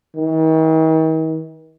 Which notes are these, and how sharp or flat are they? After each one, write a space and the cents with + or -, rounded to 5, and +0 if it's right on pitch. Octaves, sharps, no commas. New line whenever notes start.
D#3 +45